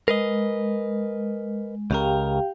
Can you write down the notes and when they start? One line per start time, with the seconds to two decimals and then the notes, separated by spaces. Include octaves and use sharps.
0.08 G#3 A#4 B4 D#5
1.91 C#2 C#3 G4 A#4 F5 G5